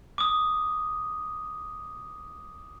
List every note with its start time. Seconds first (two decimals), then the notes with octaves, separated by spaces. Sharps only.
0.18 D6 D#6